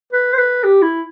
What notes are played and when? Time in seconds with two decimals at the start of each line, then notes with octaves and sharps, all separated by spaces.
0.13 B4
0.33 C5
0.38 B4
0.64 G4
0.82 E4